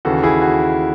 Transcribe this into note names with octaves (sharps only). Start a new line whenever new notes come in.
D#2 C#3 E3 F#4 A4
E4 G#4
F#4